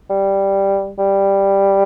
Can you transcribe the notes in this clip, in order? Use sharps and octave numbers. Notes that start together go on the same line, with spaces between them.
G3
G3